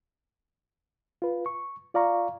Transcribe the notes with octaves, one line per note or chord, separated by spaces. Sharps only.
F4 B4
C#6
F4 D5 F5 A#5 C#6